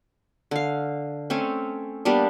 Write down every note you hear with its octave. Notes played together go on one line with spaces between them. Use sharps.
D3 F5
A3 C4 C#4
G3 A#3 B3 D4